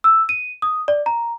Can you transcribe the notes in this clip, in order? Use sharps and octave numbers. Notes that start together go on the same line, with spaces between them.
E6
D#7
D#6
D5
A#5